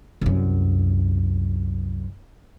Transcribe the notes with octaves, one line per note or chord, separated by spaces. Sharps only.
C2 F#2